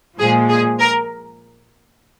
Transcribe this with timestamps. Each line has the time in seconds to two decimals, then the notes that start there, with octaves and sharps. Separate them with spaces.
0.19 A#2 F3 G#3 G#4
0.49 G#4
0.80 A#4